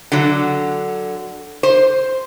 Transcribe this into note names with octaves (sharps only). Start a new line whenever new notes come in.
D3 F#3
C5